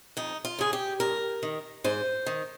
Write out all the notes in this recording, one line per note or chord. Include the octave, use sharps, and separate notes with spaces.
F2 D#4
F4
C#3 G#4
G4
G2 A#4
D#3
G#2 C5
D#3